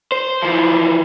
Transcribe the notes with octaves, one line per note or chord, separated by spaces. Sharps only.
C5
E3 F3